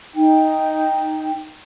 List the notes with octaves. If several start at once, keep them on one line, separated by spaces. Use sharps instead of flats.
D#4 G5